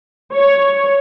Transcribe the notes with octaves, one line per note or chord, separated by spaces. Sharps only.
C#5